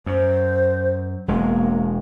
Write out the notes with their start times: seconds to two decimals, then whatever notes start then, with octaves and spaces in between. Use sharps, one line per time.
0.06 F#2 C5
1.28 E1 G#3 A#3